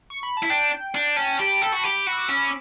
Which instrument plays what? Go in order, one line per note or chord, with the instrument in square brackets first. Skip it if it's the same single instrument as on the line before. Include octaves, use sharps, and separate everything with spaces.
[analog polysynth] C#6
B5
A5
[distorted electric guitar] E4
[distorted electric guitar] D4 [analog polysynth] G5
[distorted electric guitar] D4
[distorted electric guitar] C#4 [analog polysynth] A5
[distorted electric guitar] G4 [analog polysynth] B5
[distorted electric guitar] A4 [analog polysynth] A5
[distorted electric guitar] F#4
[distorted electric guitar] G4 [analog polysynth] B5
[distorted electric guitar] F#4
[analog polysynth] E6
D6
[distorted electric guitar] C#4